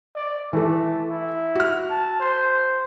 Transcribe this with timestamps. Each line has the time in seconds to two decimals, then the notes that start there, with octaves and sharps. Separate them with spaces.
0.15 D5
0.53 E3 A3 A4
1.10 E4
1.55 F#4 F6
1.89 A5
2.20 C5